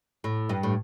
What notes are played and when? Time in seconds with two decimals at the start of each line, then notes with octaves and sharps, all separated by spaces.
0.24 A2
0.49 G2
0.63 A2